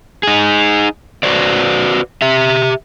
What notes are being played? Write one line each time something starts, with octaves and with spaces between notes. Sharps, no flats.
D#4 G#4
F#4 B4 C5 D5
G4 E5